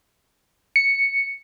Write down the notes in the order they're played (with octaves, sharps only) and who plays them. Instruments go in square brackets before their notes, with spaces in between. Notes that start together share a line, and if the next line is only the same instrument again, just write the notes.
[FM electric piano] C#7